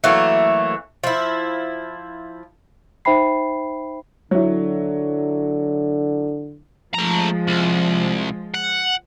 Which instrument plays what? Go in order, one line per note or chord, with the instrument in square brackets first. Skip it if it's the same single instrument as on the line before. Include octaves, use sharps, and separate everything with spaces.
[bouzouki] E3 F#3 A3 A#3
F3 E4
[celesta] D#4 C5 E5 G5 B5 C7
[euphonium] D3 [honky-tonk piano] F#3 E4
[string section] F3 G#3 [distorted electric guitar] A3 A#5
[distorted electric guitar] C2
F#5